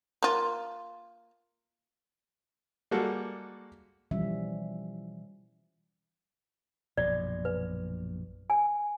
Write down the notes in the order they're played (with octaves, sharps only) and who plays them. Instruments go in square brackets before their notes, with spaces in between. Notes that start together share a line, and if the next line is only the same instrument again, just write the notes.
[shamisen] A#3 F4
[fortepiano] G3 G#3 A#3 F#4 A4
[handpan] B2 E3 F3 G3 C#4 E5
[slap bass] A#1 F#2 B2 [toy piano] D5
[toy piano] B4
G#5